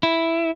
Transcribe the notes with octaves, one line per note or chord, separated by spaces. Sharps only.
E4